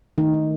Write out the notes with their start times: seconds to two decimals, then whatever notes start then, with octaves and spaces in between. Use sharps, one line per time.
0.18 D#3 A3 D#4
0.34 D#3